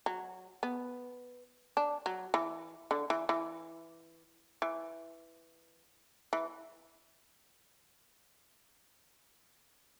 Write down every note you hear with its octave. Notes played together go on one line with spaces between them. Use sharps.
F#3
B3
D4
F#3
E3
D3
E3
E3
E3
E3